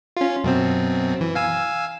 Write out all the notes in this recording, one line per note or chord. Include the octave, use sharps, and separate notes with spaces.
C#4 F4
F#2 B2 C4
E3
F5 G#5 E6